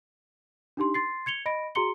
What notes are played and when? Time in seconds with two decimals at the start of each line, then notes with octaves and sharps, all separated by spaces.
0.77 D4 D#4 G4 C6
0.94 C6 A6 C7
1.26 G#6 C#7 F7 G7
1.46 D#5 B5 A#6 D7
1.75 F#4 G#4 A#5 C6 C#7 G7